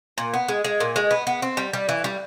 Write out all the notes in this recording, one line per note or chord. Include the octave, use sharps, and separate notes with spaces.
A#2
B3
G#3
G#3
A#2
G#3
B3
B3
C4
G3
G3
E3
G3